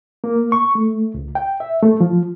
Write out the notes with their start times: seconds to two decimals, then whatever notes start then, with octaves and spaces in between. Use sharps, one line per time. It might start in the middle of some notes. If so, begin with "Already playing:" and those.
0.24 A#3
0.52 C#6
0.75 A3
1.14 C#2
1.35 G5
1.60 E5
1.82 A3
2.00 F3